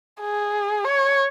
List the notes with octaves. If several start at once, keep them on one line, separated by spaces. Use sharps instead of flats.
G#4
C#5